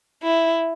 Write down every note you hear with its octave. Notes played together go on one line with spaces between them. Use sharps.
E4